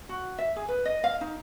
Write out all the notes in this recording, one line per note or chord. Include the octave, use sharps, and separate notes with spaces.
F#4
E5
G#4
B4
D#5
F5
D#4